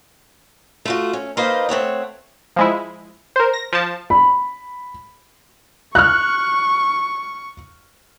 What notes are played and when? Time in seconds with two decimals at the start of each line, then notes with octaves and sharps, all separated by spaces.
0.85 A3 F4 F#4
1.13 C#4
1.37 A#3 D#4 B4 C5 D#5 F5
1.69 A3 C4 C#5 F#5
2.56 F3 G#3 E4
3.36 A#4 C5
3.53 A#6
3.73 F3 A5
4.10 B5
5.95 C#6 F6 F#6